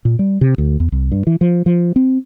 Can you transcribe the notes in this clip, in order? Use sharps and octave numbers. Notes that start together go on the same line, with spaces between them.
A#2
G3
C3
D2
E2
C2
G2
E3
F3
F3
C4